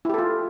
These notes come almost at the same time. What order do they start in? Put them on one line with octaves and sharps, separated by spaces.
E4 G4 A4 F4